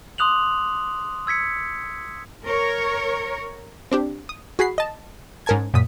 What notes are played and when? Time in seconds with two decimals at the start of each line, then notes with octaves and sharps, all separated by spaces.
0.18 C6 D6 D#6 F#6 F7 F#7
1.27 E6 G#6 B6 C#7
2.46 A#4 C#5
3.91 C4 D4 G4
4.29 D#6
4.59 F#4 G#4 B5 C7
4.78 D#5 A5
5.46 G#2 C#4 A#4 G#5 A5 G#6
5.74 F#2 A#2 D#6 B6